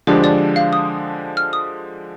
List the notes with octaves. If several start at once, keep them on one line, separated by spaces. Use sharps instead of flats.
D3 F3 G#3 D4 G4 C5
D5
F5
D#6
F6
D#6